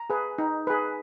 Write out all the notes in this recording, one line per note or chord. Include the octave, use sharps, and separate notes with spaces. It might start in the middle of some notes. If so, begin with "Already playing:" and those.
Already playing: A#5
G#4 B4
D#4
G#4 B4